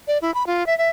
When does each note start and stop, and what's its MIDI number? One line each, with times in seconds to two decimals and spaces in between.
0.08 0.18 74
0.22 0.33 64
0.34 0.46 83
0.47 0.66 65
0.67 0.77 76
0.78 0.89 76